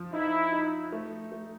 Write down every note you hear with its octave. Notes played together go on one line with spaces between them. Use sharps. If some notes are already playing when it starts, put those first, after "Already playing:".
Already playing: F3
D#4 E4
D#4
A3
A3